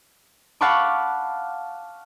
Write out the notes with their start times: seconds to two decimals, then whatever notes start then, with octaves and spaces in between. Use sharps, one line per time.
0.61 F5 F#5 A5 B5 C#6 D6